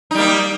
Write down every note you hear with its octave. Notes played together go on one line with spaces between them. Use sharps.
G3 A#3 D#4